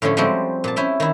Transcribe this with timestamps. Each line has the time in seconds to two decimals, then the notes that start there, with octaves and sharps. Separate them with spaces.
0.02 A2 D3 F3 C#4 A4
0.17 F3 G3 G#3 C4 F#4 G4
0.64 A#2 A5
0.76 C#4 E4 E5 G5
1.00 D#3 E4